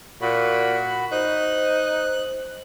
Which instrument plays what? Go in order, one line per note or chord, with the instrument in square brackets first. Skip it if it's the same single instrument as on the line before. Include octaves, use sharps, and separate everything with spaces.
[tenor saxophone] A#2 [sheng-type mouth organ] F#4 B5
[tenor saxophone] D#4 [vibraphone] C5 [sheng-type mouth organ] F#6